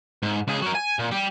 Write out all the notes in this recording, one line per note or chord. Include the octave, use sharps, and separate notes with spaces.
G#2
C#2 G#4
F#3 A#4
G#5
A#2
G3 G4